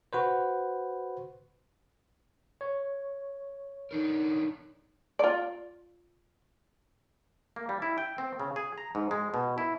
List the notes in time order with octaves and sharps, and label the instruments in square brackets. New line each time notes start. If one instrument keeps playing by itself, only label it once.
[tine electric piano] F#4 B4 C5
C#5
[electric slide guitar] D4 D#4 A#4
[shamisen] F4 D5
[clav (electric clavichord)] A#3
G3
E4
G5
C4
C#3
G#4
A#5
G#2
G#3
B2
E4